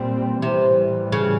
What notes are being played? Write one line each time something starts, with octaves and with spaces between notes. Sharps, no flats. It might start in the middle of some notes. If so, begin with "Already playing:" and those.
Already playing: A#2 G3 C4
A2 C3 E3 G3
C#3